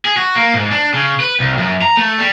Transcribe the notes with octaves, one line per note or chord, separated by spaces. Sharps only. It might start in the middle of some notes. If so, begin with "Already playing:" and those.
G#4
F#4
A#3
G#2
D4
C#3
B4
C2
F#2
A#5
A3
G3